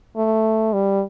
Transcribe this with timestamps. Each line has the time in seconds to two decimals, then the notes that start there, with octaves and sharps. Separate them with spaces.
0.17 A3
0.73 G3